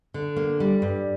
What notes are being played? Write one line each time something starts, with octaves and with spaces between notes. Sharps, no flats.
D3
A#3
G3
G2